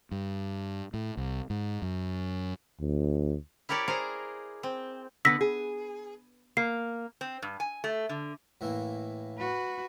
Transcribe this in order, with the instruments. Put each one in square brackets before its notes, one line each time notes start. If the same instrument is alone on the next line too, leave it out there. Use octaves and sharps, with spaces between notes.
[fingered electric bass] G2
A2
C2
G#2
F#2
[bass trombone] D2
[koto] E4 G4 A#4 C#5 D5
G#4 A#4 C5 A#5
C4
[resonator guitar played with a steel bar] D3 B3 [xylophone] E6 A#6 B6
[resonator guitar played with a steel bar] G#4
[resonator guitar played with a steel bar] A#3 [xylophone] C7
[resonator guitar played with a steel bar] C4
G2
G#5
A3
D3
[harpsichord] A2 E3 A#3
[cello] F#4 B4